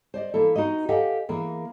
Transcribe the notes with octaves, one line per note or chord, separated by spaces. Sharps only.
C5 D5 D#5
E3 A#3 E4 A4
D#4 F#4 A#4 D#5
G4 A4 D#5 F5 F#5 G#5
E3 A#3 G#4 A#4